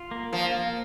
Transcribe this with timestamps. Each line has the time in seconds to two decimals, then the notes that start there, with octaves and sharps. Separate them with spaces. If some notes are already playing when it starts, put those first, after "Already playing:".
Already playing: F4
0.11 A#3
0.32 F3 A#3
0.55 A#3